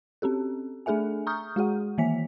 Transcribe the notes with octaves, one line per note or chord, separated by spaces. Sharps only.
C4 C#4 G4 A4
A3 D4 G#4 A4 E5 G#5
A#5 C#6 D#6 F6 G6
G#3 F#4 G#4 F#5
D#3 E3 A#3 E5 G#5 B6